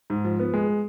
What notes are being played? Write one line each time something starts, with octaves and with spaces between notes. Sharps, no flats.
G#2
F3
B3
G#3